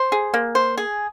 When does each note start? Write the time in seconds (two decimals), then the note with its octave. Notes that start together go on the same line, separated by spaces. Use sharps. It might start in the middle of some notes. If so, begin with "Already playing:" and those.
Already playing: C5
0.12 G#4
0.34 A#3
0.55 C5
0.77 G#4